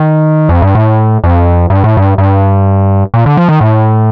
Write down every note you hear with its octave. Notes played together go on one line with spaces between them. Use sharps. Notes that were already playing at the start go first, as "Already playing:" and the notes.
Already playing: D#3
F2
G2
A2
F2
G2
A2
G2
G2
A#2
D3
F3
D#3
A2